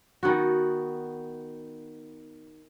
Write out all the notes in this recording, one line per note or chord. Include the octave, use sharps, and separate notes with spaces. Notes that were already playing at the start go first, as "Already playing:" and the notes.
D#3 B3 F#4